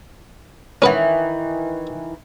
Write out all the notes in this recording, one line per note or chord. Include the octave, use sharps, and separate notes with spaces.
D#3 E3 C#4 B4 F#5